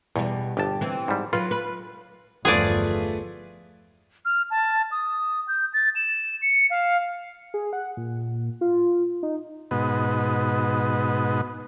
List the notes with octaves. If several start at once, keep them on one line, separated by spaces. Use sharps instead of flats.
E2 B2 G3
G1 G4 A5
E3 C4
G#2 G3
F#3 F4 B4
B4
G1 E2 F3 A3 F4 G#4 B4 D5
F6
A5
D#6
G6
A6
E7
C#7
F5
G#4
F#5
A#2
F4
D#4
G#2 B2 B3 D#4 F#4